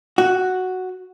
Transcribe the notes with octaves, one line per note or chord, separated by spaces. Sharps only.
F#4